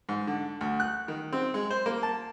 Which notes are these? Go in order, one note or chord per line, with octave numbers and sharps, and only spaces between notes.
G#2
D3
D2
F#6
D#3
C4
G#3
C5
A#3
A5